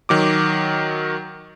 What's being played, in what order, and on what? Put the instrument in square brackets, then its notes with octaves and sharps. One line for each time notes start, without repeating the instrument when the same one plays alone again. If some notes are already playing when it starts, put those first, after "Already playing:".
[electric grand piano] D#3 F#3 D6